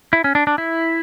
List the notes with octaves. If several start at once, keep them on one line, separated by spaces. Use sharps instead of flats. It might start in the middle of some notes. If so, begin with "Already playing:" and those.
E4
C#4
D4
D4
E4